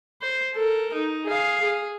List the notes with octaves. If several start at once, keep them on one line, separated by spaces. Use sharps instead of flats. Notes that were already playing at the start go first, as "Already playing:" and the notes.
C5
A4 A#4
D#4
G#4 F5
G#4